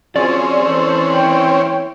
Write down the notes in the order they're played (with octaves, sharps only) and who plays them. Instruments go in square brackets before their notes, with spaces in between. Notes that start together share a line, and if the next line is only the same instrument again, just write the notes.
[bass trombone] F3 [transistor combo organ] C4 C#4 [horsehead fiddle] F#4 G#4 [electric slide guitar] D5
[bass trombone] E3 [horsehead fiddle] A4 C5
[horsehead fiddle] C#5 G5